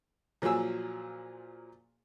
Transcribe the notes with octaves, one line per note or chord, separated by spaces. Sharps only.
A#2 F3 F#3 G#4 E6